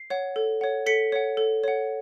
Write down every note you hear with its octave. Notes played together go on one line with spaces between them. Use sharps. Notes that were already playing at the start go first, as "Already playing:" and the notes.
Already playing: C7
C#5 F#5
A4
C#5 F#5
A4 B6 C#7
C#5 F#5
A4
C#5 F#5